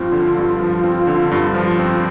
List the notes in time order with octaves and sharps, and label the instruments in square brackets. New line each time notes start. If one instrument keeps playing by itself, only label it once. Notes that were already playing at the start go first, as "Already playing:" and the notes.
Already playing: [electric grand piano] G2 F3 C4 [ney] F4
[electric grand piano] D3
G2
F3
C4
D3
G2
F3
C4